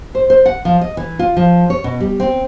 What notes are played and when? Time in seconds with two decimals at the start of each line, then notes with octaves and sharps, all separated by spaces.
0.15 C5
0.30 C5
0.46 F#5
0.65 F3
0.81 D#5
0.97 E3
1.19 F4
1.37 F3
1.70 C#5
1.84 B2
2.00 G3
2.20 C4